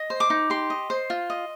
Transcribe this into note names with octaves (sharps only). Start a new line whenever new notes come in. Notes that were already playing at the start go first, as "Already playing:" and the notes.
Already playing: D#5
C5
D6
D#4
G4 C6
D#5
C5
F4
D#5